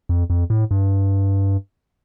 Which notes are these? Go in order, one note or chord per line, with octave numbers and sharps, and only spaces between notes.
F2
F2
A2
G2